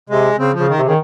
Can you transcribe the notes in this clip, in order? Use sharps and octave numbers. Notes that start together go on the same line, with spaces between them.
C3 G#3
C#3 C4
C#3 F3
D#3
C3
C#3
D#3